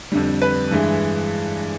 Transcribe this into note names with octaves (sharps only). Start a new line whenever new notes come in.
F2 D3 G3
B4
G2 E3 G#3